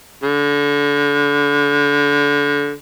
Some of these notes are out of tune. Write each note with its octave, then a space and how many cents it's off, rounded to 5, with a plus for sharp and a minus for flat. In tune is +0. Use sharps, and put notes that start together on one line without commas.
D3 -25